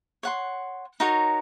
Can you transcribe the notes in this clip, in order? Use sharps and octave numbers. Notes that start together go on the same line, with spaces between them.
C#5 F#5 C6
D#4 F#4 A#4 C#5